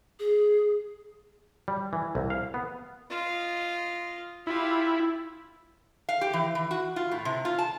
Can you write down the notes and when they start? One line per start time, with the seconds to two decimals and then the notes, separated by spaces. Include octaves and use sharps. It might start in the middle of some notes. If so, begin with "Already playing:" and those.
0.19 G#4
1.68 G3
1.93 E3
2.15 C2
2.30 F5
2.54 B3
3.10 F4 D#5
4.47 E4 F4 G4
6.09 F5
6.21 G4
6.33 E3
6.55 E3
6.71 F#4
6.96 F4
7.11 A2
7.25 C3
7.45 F4
7.59 A5